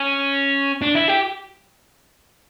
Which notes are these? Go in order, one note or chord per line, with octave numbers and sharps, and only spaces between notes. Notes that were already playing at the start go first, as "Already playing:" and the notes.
Already playing: C#4
D4
E4
G4